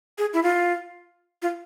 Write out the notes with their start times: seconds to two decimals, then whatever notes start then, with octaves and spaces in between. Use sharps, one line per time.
0.18 G#4
0.33 E4
0.43 F4
1.42 F4